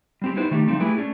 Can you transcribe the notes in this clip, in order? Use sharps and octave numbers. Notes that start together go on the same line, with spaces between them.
G3 C4 G4
B3 D#4 E4 G4 B4 C5
D#3 A3 D#4 F#4 G4
F3 G3 A3 C4 D#4
A3 E4 G4 G#4 B4
A3 C#4 D4